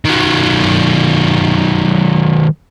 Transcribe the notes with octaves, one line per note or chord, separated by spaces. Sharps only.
D#3 F#3